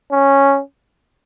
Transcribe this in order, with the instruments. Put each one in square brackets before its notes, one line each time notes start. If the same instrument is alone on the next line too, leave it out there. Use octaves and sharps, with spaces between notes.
[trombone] C#4